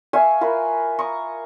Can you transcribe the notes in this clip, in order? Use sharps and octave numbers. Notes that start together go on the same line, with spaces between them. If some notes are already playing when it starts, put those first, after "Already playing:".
E5 F5 G#5 C#6
F4 A#4 B4
A#5 C#6 D#6